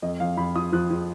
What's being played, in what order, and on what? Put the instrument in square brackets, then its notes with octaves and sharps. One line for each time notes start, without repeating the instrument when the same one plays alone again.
[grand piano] F2 D#5
F2 F5
F2 B5
F3 D#6
F3 F#6
F3